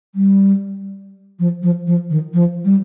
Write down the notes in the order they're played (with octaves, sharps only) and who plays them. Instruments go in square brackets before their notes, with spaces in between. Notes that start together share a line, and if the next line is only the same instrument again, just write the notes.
[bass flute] G3
F3
F3
F3
D#3
F3
G3